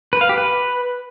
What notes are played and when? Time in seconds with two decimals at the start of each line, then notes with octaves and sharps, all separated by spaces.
0.13 B4
0.21 F5
0.29 G4
0.38 B4